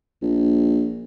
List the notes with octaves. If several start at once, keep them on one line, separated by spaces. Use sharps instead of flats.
A#1